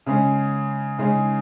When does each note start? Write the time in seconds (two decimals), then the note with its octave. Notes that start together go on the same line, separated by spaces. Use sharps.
0.06 C#3 G#3 C#4 G#4
0.98 C#3 G#3 C#4 G#4